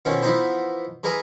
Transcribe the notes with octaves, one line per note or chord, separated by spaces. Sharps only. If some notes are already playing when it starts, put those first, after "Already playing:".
B2 D#3 F3 C#4 E4
E3 F3 B3 D#4 E4 C5
E3 G#3 A#4 B4 D#5 G#5